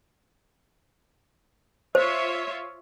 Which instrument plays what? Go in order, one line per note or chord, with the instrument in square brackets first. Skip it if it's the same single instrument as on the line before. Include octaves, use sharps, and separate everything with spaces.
[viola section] F4 C#5 E5 [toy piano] C5